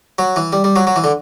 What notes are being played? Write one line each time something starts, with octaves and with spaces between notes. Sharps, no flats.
F#3
E3
G3
G3
F#3
F#3
E3
D3